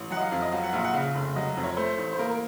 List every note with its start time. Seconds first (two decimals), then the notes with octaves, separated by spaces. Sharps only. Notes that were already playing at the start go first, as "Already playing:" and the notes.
Already playing: A1
0.10 F#3 F#5
0.17 D#5
0.21 F5
0.32 F2 F5
0.42 D#5
0.52 F#3 F5
0.63 F#5
0.73 A#1 F5
0.84 F#5
0.94 C#3 F5
1.15 F1
1.36 F#3 D#5
1.57 F2
1.63 C#5
1.77 A3 C5
1.98 A1
2.13 C5
2.18 A#3 A#4
2.29 A#4